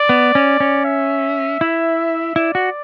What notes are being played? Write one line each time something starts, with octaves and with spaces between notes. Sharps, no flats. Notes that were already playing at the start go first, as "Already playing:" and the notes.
Already playing: D5
B3
C#4
C#4
E5
E4
E4 D5
F#4